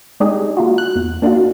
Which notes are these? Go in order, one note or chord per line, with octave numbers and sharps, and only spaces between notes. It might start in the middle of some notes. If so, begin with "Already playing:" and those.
G#3 D4 D#4 G4 G#4
A#3 F4 F#4
F#6
E2
A#3 D4 D#4 F4 F#4